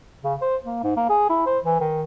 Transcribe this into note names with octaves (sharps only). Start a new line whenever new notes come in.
C#3
C5
A#3
G#2
A#3
G#4
E4
C5
E3
D#3